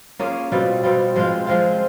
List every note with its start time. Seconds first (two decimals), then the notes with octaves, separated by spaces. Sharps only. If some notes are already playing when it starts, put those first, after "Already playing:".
0.19 A#3 C#4 F4 G#4
0.52 B2 G3 C4 F4
0.83 B2 G3 C4 F4
1.15 F3 G#3 C4 F4
1.47 F3 G#3 C4 F4